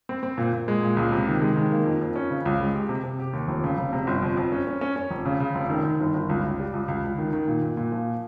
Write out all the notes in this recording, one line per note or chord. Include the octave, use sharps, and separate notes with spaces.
C4
C4
A#2
A#2
G#3
A#2
C#2
C3
D#3
G#3
D#3
A#3
F2
F2
C#4
C#3
C#2
G#3
G4
C3
C3
G4
D#2
F1
C#3
F1
C3
G1
F2
F2
C#4
C#4
C#4
C#4
F1
C#3
C#3
F1
D#3
D#3
G1
G1
C#2
C#2
G3
C#2
C#2
C#2
D#3
D#3
A#2
A#2
A#2
F3